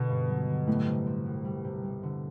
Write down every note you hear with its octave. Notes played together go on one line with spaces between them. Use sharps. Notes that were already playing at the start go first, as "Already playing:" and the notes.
Already playing: B2 D3 B3
G2
F#3
D3
A2 G3
C3
C4
C2
G3
C3
G3
D3